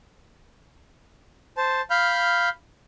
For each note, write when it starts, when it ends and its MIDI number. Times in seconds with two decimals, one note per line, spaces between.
1.57 1.81 72
1.57 1.81 81
1.90 2.49 77
1.90 2.49 83
1.90 2.49 89
1.90 2.49 91